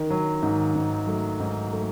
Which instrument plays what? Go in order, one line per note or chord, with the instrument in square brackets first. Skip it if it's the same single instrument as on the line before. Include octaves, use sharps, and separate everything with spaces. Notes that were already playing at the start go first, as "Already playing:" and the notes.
Already playing: [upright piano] D#3
F#3
[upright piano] G#2 [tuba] D#3
[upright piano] G#2
[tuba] F#3 [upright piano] A3
[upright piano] G#2
A3